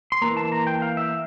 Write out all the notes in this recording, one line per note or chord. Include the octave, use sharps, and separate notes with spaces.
C6
E3 A#3 A#5
A5
A#5
G5
F5
E5